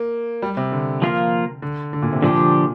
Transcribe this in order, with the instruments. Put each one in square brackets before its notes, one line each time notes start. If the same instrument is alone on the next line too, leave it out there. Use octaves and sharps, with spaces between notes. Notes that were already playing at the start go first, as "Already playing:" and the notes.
Already playing: [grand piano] A#3
G3
C3
D3
[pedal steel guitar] F3 A#3 F4 A#4
[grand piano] D3
D3
A#2
C3
[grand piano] A#2 [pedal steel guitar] D3 F3 D4 G4